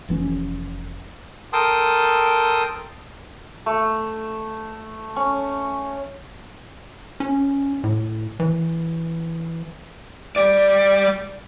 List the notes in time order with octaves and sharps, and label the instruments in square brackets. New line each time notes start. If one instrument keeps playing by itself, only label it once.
[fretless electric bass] F1 E3 C4 C#4
[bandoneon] A4 A#4 G5 A5 C6 D#6
[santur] A3
C#4
[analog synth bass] C#4
A2
E3
[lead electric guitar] G3 D5